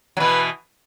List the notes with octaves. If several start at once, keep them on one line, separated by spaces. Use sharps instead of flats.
F#3
B2 E3 B4